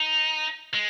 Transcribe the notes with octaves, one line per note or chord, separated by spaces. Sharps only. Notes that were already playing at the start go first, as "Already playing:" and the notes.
Already playing: D#4
G#3